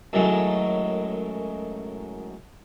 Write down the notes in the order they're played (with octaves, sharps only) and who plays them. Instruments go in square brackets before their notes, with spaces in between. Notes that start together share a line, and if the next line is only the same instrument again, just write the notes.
[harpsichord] F#2 A2 D#3 F#3 G#3